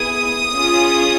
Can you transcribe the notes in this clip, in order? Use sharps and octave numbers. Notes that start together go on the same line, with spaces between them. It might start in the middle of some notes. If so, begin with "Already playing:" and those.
Already playing: B3 E4 G#4 D#6
C#4 F4 G#4